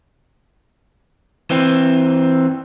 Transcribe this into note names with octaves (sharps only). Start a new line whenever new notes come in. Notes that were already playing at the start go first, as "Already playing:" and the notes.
E3 C4